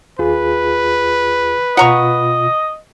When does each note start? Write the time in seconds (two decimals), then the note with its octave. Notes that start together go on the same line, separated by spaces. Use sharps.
0.19 D#2 F4 G#4 B4
1.77 B2 F4 D#5 F#5 A#5 C#6